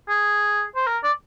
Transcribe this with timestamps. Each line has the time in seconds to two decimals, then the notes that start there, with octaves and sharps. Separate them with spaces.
0.08 G#4
0.76 C5
0.87 A#4
1.04 D5